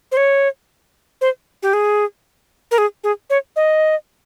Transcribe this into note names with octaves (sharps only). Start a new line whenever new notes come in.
C5
C#5
C5
G4
G#4
A#4
G#4
G#4
C#5
D#5